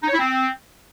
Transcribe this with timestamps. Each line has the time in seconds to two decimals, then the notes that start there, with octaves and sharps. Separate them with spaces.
0.03 D#4
0.08 C#5
0.13 E4
0.18 C4